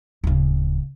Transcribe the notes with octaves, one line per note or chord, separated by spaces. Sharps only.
D1 C#3